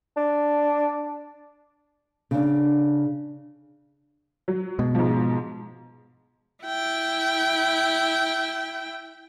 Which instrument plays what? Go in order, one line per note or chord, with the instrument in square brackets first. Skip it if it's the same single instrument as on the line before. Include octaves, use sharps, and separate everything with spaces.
[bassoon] D4
[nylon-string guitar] C#3 D4
[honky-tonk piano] F#3
[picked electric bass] B2 G#3
[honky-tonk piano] G#2 F3
[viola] E4 G5